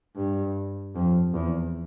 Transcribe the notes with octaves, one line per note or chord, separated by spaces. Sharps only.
G2
F2
E2